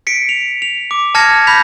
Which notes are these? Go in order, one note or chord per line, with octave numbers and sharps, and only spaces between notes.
B6 C#7 D7
F7
F7
D6
A5 F6 G#6 A#6 C#7
B5 G6 A#6 B6 F7